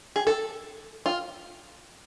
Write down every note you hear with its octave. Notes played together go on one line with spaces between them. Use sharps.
G#4
A4
F4